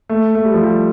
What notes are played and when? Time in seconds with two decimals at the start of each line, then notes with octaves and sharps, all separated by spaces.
0.09 A3
0.35 A3
0.45 G3
0.54 F3
0.64 G3